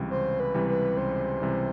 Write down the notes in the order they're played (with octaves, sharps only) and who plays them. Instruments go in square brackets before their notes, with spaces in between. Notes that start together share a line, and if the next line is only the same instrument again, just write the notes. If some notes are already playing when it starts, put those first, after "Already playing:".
Already playing: [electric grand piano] C#2 C3 E3 G3
[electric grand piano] C#2 [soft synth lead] C5
[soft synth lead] B4
[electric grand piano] C3 E3 G3
[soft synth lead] B4
[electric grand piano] C#2 [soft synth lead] C5
[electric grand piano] C3 E3 G3